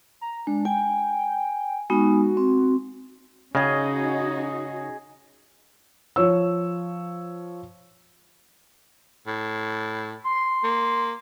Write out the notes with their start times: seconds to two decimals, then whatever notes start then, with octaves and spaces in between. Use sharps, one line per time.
0.21 A#5
0.47 G#3 D4
0.65 G5 G#5
1.90 G#3 B3 D#4 F#4
2.37 C4
3.55 C#3 C#4 D#4 F#4 G#4 D#5
6.16 F3 C#5 E6
9.27 A2
10.24 C6
10.64 A#3